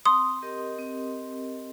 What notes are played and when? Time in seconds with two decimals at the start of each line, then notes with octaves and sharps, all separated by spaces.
0.06 C4 C6 D#6
0.42 G4 A#4 D#5
0.78 C4